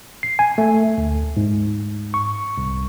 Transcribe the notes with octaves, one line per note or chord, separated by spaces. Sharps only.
C7
G#5
A3
D2
G#2
C#6
C2